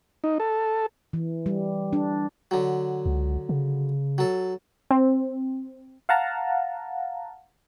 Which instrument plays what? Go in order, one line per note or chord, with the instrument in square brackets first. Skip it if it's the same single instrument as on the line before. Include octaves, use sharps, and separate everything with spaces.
[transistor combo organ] D#4
A4
[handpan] E3
G3
D4
[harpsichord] D3 F#3
[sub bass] C#2
C#3
[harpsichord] F#3 A4
[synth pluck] C4
[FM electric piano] F5 F#5 A5 A#5